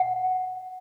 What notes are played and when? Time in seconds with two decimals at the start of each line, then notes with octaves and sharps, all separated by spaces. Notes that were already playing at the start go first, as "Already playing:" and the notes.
Already playing: F#5